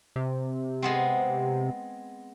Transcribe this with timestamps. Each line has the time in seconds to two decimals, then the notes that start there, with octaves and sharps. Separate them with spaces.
0.16 C3
0.82 G#3 B3 C4